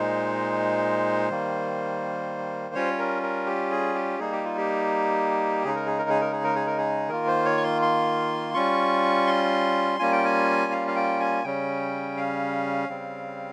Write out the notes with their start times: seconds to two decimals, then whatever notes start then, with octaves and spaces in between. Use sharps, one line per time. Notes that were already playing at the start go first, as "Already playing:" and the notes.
Already playing: A#2 G#3 D#4 C5
1.30 D#3 G3 A#3
2.75 G3 C#4 F4 C#5
2.98 A#4
3.23 A#4
3.46 G4
3.71 G#4
3.95 G4
4.19 G3 A#3 D#4 G#4
4.32 G4
4.44 F4
4.58 G4
5.64 C#3 G#3 D#4 G#4
5.76 A#4
5.87 G#4
5.98 A#4
6.10 G#4
6.21 A#4
6.32 G#4
6.44 A#4
6.55 G#4
6.66 A#4
6.78 G#4
7.09 D#3 A#3 F4 A#4
7.27 C5
7.45 C#5
7.57 C#6
7.63 C6
7.82 C6
8.54 G3 C#4 F4 C#6
9.27 C6
9.99 G3 A#3 C#4 F4 G#5
10.12 G5
10.25 G#5
10.72 F5
10.88 F5
10.96 G5
11.20 G#5
11.44 C#3 G3 C#4 G5
12.17 F5
12.89 C#3 G3 C4